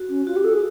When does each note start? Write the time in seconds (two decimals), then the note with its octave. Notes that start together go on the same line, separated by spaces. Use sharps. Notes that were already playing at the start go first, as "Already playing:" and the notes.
Already playing: F#4
0.09 C#4
0.27 F4 F#4
0.36 G4
0.44 A4
0.54 G#4